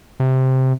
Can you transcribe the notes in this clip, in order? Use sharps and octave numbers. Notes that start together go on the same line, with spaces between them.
C3